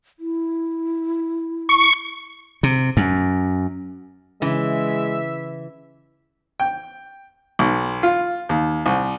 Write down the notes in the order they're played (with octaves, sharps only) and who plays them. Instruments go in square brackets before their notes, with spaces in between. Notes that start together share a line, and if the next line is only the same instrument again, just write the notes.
[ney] E4
[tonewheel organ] C#6
[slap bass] C3
F#2
[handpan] C#3 C#4 [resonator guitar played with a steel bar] E3 [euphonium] G#3 [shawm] E5
[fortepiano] G5
B1
F4
D#2
C2